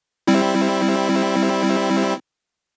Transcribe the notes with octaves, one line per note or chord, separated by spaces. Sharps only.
G3 C4 E4